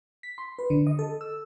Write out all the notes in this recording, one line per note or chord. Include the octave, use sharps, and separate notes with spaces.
B6
C6
B4
D3
D#5
A4
E6